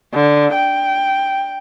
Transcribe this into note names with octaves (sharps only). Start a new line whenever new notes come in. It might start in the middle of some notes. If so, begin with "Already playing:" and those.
D3
G5